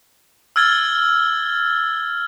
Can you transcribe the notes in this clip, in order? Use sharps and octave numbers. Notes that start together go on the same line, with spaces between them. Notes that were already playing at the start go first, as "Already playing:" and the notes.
E6 F6 G#6 A6 G7